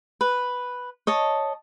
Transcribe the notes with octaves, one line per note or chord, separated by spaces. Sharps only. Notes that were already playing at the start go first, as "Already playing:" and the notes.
B4
C#5 D#5 A5